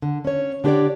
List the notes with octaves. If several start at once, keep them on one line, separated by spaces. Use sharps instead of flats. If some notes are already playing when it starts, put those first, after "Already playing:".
D3
C#4 C#5
D3 D4 G4 B4 C#5 D5